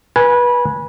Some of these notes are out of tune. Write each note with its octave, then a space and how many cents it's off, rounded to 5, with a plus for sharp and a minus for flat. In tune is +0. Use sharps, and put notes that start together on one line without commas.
B4 -25 G#5 +0